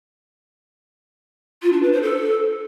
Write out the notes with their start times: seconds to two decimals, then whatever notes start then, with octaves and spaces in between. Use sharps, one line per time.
1.62 F4
1.72 D4
1.82 B4
1.92 C5
2.02 A4